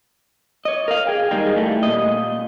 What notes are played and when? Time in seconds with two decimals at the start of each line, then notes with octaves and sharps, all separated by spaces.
0.65 C#5 D#5
0.88 A#4 F5
1.07 G#4 G5
1.31 D#3 G3 G#3 A#3
1.56 A2 G3 A3
1.83 A#2 D#5